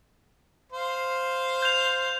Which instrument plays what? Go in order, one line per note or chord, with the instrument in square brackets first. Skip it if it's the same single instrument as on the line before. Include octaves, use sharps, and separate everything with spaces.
[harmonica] C5 F5
[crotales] G6 F7